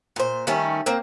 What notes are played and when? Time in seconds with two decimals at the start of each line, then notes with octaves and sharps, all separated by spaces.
0.16 A#2 C5
0.47 D#3 G3 A3 C#4
0.86 A#3 C4